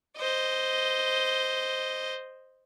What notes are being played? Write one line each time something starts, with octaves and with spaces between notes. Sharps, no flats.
C5 D#5